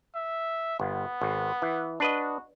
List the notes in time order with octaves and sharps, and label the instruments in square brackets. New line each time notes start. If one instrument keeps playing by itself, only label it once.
[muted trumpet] E5
[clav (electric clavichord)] G1 [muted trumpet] B3
[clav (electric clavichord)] G#1
E3
[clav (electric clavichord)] D4 B4 D#5 [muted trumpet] F#4